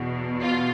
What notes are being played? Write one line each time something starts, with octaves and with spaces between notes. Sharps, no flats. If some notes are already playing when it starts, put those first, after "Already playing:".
Already playing: E2 B2
F4